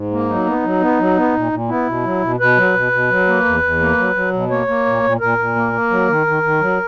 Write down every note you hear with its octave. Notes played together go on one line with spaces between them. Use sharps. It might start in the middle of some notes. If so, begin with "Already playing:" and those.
Already playing: G#2
A#3
F#3 D#4
B3
F#3
B3
F#3
B3
A#2
A#2
B3 E4
B2
F#3
B2
B2 B4
F#3
B2
B2
F#3
A#3
E2
E2
A#3
F#3
F#3
B2
A#3 C#5
A#3
A#2
A#2
A#2 A#4
A#2
A#3
A#3
F#3
D#3
D#3
D#3
F#3